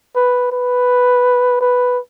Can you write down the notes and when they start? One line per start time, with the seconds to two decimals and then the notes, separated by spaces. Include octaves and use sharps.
0.16 B4
0.52 B4
1.61 B4